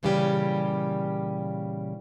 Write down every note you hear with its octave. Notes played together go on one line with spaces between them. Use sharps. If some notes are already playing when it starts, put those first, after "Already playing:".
A#2 C#3 E3 G3 C#4 G4